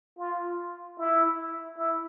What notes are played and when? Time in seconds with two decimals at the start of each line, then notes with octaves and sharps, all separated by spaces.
0.18 F4
0.98 E4
1.78 E4